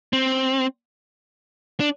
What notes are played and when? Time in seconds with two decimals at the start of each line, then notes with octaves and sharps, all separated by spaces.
0.13 C4
1.80 D4